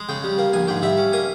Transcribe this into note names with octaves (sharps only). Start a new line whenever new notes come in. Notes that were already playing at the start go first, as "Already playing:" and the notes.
Already playing: G#3
C#3 G5
G3
A#3
A#1 G#5
G#2 G5
G3 E5
C#4
A#3 G#5